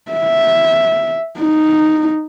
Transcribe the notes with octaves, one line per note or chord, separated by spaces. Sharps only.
E5
D#4